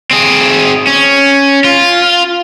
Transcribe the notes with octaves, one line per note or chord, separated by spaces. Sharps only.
C4 G#4
C#4
F4